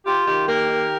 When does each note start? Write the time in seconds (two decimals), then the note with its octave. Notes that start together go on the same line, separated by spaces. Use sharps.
0.06 F4 G4
0.26 D#3 G4
0.47 A#3 G4 A#4
0.68 D#3